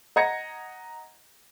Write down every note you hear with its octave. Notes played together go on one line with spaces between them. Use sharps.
D#5 F#5 A#5 G#6 A#6 C#7